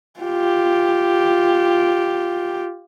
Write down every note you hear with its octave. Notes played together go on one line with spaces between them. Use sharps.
F4 G4